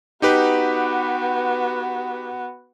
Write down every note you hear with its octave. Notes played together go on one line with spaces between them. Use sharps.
B3 D#4 F#4 G4 B4